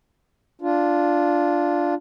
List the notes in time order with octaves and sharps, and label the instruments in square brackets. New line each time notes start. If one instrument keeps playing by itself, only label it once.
[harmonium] D4 F4